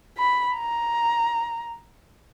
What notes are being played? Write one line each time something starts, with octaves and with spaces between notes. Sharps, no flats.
B5
A#5